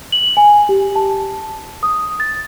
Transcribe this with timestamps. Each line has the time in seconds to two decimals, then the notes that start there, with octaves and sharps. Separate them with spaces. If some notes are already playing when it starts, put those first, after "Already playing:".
0.12 F#7
0.37 G#5
0.69 G4
0.96 A5
1.83 D#6
2.20 A6